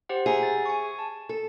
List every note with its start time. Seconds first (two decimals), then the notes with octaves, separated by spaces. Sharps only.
0.09 G4 C5 F#5
0.26 G#4 E5 F#5 A#5
0.43 A6
0.66 G#5 C#6
0.99 A5
1.29 A4